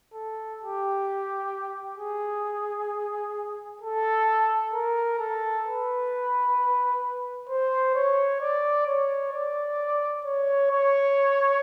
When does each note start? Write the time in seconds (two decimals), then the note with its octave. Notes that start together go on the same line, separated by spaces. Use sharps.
0.14 A4
0.60 G4
1.98 G#4
3.82 A4
4.73 A#4
5.19 A4
5.65 B4
7.49 C5
7.95 C#5
8.40 D5
8.87 C#5
9.33 D5
10.25 C#5
10.71 C#5